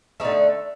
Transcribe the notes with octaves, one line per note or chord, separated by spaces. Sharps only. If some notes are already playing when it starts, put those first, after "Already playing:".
D3 A3 D#4